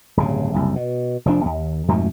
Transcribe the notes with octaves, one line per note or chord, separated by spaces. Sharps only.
D1 G2 C#3
F#1 C2
B2
F1 F3 D4
D#2
F2 G#2 B2 A3